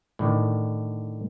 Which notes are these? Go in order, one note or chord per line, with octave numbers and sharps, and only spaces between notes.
A2 D3 D#3